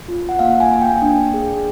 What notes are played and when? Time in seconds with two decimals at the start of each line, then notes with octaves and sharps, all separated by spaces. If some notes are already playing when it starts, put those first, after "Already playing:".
0.08 F4
0.29 F#5
0.39 A#3 F5
0.60 G#5
0.70 A#3 G#5
0.82 G5
1.02 D4
1.34 G#4